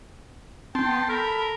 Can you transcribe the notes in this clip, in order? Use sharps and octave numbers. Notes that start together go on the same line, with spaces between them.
C4 G5 A5 C6
B3
A4 A#4 B5